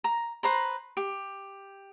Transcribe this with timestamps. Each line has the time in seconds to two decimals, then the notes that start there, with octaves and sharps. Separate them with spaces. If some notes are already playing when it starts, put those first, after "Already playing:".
0.04 A#5
0.43 B4 C5 A#5 B5
0.97 G4